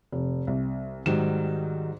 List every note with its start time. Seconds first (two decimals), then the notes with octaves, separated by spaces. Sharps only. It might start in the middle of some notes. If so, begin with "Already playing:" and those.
0.12 F1
0.47 C2
1.06 G#2 D#3 F#3 G3 E7